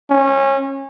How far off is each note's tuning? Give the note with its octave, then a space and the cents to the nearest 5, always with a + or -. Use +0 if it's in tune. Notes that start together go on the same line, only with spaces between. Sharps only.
C#4 -25